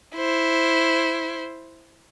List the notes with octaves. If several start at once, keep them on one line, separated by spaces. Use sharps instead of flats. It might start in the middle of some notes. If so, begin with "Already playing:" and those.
E4 C5